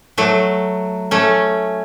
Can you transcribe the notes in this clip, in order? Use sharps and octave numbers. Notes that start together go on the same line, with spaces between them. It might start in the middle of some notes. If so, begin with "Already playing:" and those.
F#3 A3
A3 C#4